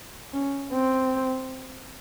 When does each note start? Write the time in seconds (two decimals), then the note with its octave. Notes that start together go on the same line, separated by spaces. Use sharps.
0.34 C#4
0.72 C4